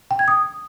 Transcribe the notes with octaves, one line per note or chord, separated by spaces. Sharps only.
G5
G#6
D#6